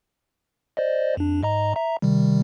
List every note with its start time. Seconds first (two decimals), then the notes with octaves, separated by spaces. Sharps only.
0.77 C5 D5 D#5
1.17 F2 D4
1.43 G#2 D#5 A#5
1.75 E5 A#5
2.02 C3 D#3 G3